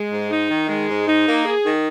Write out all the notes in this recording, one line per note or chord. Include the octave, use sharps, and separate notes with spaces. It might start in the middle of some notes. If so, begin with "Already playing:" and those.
Already playing: G#3
G#2
D#4
D#3
G#3
G#2
D#4
A#3
G#4
D#3